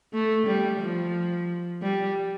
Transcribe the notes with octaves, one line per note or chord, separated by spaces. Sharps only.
A3
G3
F3
G3